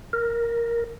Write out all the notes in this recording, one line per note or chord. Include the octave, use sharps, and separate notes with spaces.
A#4